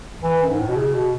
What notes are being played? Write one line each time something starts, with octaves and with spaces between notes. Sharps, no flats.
E3
F#2
G#2
A2
B2
C#3
B2